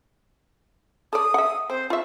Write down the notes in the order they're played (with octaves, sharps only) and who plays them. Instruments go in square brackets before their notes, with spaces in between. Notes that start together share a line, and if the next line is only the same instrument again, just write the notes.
[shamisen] A4 D5 [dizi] D#6
[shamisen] E5 F#5
[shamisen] C4 [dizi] C5
[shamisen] F4 E5 [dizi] C#6